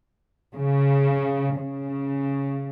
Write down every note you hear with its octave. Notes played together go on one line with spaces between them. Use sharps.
C#3
C#3